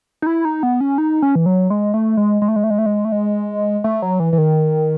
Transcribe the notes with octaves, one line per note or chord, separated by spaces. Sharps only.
D#4
E4
D#4
B3
C#4
D#4
C#4
E3
F#3
G#3
A3
G#3
G#3
A3
G#3
A3
G#3
A3
G#3
A3
G#3
A3
F#3
E3
E3
D#3